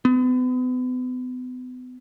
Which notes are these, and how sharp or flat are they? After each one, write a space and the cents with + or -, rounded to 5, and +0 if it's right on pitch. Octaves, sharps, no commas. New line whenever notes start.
B3 +35